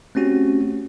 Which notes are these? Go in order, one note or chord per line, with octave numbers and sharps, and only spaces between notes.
A3 C4 C#4 F#4 G4